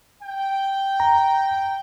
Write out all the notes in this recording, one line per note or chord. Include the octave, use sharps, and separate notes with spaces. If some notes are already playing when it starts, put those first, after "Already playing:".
G5
A#5